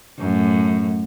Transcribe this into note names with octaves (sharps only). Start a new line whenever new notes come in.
F#2 A2